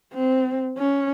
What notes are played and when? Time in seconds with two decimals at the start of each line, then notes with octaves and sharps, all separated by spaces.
0.13 C4
0.78 C#4